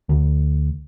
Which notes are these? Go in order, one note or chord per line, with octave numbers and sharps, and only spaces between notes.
D2